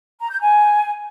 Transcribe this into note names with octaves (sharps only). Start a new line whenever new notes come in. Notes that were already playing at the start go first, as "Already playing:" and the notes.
A#5
G6
G#5